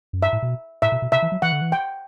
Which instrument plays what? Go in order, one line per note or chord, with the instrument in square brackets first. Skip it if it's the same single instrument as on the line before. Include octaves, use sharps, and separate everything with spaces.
[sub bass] F#2
[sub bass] G2 [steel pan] E5
[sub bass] A2
B2
[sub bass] A2 [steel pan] E5
[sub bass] B2
B2
[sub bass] C3 [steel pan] E5
[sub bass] E3
F#3
[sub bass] E3 [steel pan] F#5
[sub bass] D3
E3
[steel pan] G5